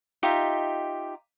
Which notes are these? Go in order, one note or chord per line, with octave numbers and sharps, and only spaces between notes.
D#4 F4 G4 E5